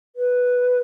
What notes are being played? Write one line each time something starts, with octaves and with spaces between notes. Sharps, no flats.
B4